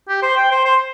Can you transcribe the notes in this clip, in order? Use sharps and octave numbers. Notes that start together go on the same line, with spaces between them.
G4
C5
G5
C5
C5